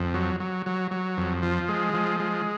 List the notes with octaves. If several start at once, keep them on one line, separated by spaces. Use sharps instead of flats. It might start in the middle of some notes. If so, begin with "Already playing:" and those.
Already playing: F2
F#3
F#3
F#3
F#3
F2
F3
G#3
F3
G#3